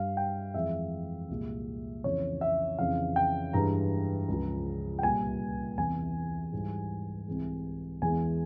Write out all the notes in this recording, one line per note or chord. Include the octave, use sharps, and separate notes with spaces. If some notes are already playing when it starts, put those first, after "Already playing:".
Already playing: G2 G3 F5
G5
F2 E3 G#3 E5
C2 A#2 G#3
F2 C#3 E3 C#5
E5
F2 C#3 E3 F5
G5
G2 E3 G#3 A#5
C#2 C#3 F3
G5
C2 A#2 G3 G#5
E2 C3 E3 G#5
G#2 E3 G3
C2 C3 E3 G#3
E2 E3 G#3 G#5